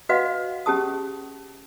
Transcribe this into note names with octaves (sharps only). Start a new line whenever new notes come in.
F#4 B4 D#5 F5 F#5
C#4 G4 G#4 A5 D#6